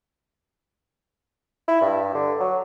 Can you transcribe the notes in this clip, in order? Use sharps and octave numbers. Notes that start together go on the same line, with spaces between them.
E4
G2
D3
F#3